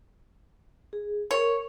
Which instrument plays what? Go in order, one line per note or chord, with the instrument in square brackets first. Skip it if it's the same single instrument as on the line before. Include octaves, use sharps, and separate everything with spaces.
[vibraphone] G#4
[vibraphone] A#4 [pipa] C#5